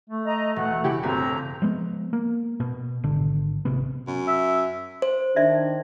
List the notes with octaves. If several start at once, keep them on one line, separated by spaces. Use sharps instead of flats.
A3
D#5 A#5
E1 F#5
C#3 E4 G4
G1 E2 C4 F#4 A#5
F3 G#3 B3
A#3
B2
G#1 D3
G#1 C3 B3
F#2
E5
C5
D#3 D4 D5 E5